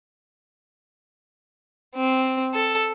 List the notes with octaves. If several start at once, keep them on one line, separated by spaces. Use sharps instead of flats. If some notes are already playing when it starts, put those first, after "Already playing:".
C4
A4